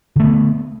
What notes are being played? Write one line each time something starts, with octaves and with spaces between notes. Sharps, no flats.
D3 A3 B3